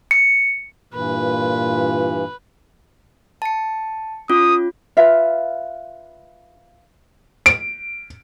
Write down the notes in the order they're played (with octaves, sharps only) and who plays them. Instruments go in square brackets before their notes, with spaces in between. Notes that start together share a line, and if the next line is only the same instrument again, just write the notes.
[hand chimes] C#7
[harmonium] G2 E3 [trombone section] A#2 F4 [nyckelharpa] B4
[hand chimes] A5 C#7
[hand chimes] C#4 F4 [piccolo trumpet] D#6
[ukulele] F4 B4 E5 F5
[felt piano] D7